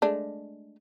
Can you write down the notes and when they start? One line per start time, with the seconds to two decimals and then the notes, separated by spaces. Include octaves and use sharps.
0.02 G#3 A3 D4